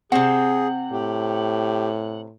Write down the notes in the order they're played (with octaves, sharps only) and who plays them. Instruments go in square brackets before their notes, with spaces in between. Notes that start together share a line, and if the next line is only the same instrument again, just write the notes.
[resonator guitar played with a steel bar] C3 C4 [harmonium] G#4 [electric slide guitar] F#5
[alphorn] A2 [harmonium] G4